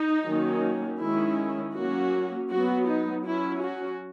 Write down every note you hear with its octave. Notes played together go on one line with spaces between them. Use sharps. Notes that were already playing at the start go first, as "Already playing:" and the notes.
Already playing: D#4
D#3 F#3 A#3 C#4
D#3 G#3 C#4 E4
F#3 A#3 C#4 F#4
F#3 B3 F#4
D#4
F#3 C#4 E4
F#4